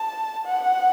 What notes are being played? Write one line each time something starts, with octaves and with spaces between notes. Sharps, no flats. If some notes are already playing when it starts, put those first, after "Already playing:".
Already playing: A5
F#5